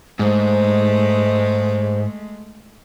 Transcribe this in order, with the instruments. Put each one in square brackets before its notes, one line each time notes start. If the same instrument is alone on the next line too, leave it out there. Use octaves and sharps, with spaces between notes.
[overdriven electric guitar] G#2 [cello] G#3 A3 [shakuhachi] C5